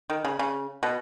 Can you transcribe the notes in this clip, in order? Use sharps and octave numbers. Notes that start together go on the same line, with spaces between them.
D#3
C#3
C#3
B2